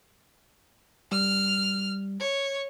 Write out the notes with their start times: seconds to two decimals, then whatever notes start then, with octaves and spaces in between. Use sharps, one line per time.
1.12 G3 F6
2.20 C#5